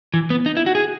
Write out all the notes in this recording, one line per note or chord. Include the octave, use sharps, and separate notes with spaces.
E3
B3
D#4
E4
F#4
G#4